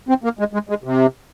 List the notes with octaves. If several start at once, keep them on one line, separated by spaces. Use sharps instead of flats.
C4
A#3
G#3
G#3
G#3
C3